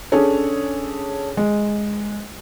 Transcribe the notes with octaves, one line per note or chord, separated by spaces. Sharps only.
C#4 D4 G#4 A4 C#5
G#3